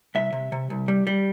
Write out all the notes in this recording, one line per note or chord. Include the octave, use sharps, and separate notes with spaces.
C2 E5
C3
C3
C2
G3
G3